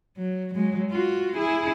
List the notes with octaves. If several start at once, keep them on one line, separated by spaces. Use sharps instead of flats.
F#3
F#3 G#3
F4 F#4
E4 G#4